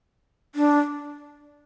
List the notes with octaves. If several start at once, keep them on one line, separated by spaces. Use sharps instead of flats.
D4